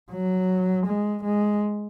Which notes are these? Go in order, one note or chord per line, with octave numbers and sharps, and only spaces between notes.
F#3
G#3
G#3